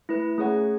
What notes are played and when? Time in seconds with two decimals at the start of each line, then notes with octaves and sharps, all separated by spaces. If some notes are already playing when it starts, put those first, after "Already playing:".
0.09 A3 E4 B4
0.38 A3 C#4 G#4 C#5 F#5